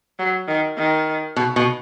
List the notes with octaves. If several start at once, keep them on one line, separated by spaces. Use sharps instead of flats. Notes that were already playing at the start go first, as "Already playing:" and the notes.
F#3
D#3
D#3
B2
B2